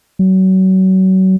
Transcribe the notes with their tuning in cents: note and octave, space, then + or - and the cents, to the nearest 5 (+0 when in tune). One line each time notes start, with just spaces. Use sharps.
F#3 +30